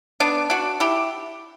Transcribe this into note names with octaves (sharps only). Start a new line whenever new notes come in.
B3 D4
D4 F#4
E4 G4